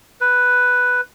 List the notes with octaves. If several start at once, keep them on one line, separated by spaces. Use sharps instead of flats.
B4